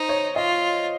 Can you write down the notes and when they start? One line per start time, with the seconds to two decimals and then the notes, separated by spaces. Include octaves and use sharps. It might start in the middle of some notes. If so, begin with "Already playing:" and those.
Already playing: D#4 C5
0.09 C#5
0.36 F4 D#5